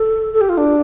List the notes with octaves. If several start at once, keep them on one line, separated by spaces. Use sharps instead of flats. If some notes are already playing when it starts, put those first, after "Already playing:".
Already playing: A4
A4
G4
F4
D4